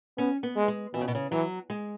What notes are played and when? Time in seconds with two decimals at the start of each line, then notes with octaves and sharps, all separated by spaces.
0.18 B3 C#4
0.43 B3
0.56 G#3
0.68 G#3
0.94 B2 E3
1.01 C#3
1.08 B2
1.15 C#3
1.32 E3 F#3
1.70 G#3